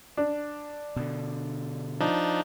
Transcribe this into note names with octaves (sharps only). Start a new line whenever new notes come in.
D4
B2 D3
F3 D4 D#4